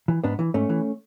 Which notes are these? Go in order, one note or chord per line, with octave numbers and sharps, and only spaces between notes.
E3
G#2 B3 D4
E3
G#2 A3 C#4
E3